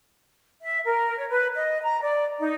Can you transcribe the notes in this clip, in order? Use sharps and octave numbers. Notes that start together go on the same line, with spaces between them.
E5
A#4
C#5
B4
D#5
A#5
D5
D#4